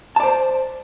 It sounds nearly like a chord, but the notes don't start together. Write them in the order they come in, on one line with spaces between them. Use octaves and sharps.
A5 D5 C5